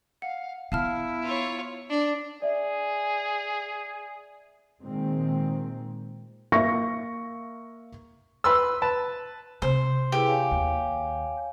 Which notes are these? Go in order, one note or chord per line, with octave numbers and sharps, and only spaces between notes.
F5 F#5
B3 E4 F5 A5 F6
F4 C#5
D4
G#4 D5 E5
A#2 D#3 G#3 C4
A#3 E5 C#6 A#6
B4 C6 E6
B4 A5
C3 C5
E4 G4 G#4 B4
C#5 F5 G#5
D#2